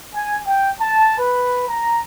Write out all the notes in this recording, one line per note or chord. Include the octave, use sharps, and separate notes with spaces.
G#5
G5
A5
B4
A#5